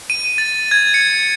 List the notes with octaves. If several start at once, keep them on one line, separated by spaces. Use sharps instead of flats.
D#7
A6
G#6
C#7